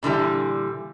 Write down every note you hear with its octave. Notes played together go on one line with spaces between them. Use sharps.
A#2 D3 E3 G3